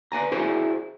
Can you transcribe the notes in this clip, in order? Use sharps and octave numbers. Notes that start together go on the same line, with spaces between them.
B4 D5 G#5 A#5
E4 F#4 G#4 A#4 C5 D5